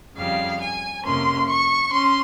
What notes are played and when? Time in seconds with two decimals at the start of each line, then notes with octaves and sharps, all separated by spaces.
0.17 F2 C#3 G3 F5
0.61 G#5
1.04 F2 C3 F3 A#3 C#4 C6
1.48 C#6
1.92 C#4 C6